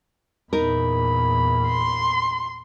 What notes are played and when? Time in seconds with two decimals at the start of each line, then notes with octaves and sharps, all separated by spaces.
0.53 E2 A#2 D#4 A#4 B5
1.68 C6